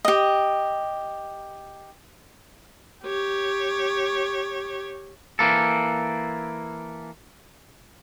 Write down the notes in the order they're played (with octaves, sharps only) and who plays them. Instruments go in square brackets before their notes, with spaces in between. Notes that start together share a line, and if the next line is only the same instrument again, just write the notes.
[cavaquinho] G4 D#5
[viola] G4 C#5
[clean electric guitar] E3 A#3 A4